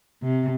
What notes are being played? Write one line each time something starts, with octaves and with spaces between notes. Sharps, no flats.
C3